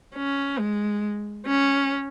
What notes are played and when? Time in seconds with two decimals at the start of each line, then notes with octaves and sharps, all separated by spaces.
0.15 C#4
0.59 G#3
1.47 C#4